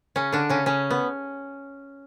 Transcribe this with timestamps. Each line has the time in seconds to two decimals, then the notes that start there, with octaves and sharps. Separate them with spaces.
0.16 C#3 C#4
0.33 D3 D4
0.49 C#3 C#4
0.66 C#3 C#4
0.90 B3